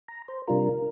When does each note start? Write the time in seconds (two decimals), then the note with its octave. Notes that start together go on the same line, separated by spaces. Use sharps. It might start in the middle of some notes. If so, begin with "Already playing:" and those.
0.08 A#5
0.28 C5
0.48 C3 G3 D4 F4 A#4